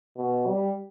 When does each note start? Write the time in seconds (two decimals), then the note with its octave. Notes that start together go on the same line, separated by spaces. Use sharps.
0.17 B2
0.47 G3